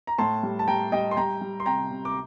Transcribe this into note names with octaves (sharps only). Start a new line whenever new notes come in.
A#5
A2 A5 C6
G3
A5
G3 G5 A#5
G3 D#5 G5
C6
G3 G5 A#5
G3
C6
C3 G5 A#5
C3
D6